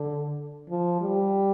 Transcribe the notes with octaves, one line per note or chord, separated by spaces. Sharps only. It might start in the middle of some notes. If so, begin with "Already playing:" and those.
Already playing: D3
F3
G3